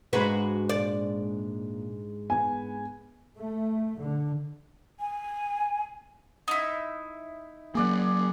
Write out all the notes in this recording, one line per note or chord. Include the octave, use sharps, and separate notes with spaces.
G#2 G#3 D4 F#4 G#4 B4
A#2 D5
B3 G#5
A3
D3
G#5
D#4 E4
F#3 A#3 G#4 D5 F#5